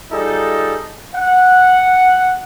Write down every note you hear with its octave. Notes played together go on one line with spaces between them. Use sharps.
G3 D#4 F4 G#4 A4
F#5